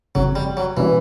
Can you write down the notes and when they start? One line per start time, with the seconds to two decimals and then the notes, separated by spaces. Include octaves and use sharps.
0.15 G1 F2 C#3 F#3
0.35 G3
0.57 F#3
0.77 B2 E3 G3 A#3 C#4